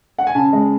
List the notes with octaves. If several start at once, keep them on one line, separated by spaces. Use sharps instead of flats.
F#5
G#5
C#3 A5
G#3